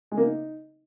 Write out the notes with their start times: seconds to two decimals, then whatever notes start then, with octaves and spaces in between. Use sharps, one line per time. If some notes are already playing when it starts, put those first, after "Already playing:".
0.12 G#3
0.17 A#3
0.23 D#4